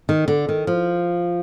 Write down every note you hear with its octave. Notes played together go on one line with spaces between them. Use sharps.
D#3
D3
D#3
F3